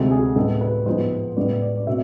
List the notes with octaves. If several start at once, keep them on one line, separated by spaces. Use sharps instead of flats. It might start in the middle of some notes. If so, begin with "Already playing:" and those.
Already playing: D2 C3 G#3 C4 A4
G#4
A2 G#3 B3 A4
B4
G#2 F3 G#3 B3 C5
A2 G#3 B3 D5
D5
D5
B2 A3 C4 E5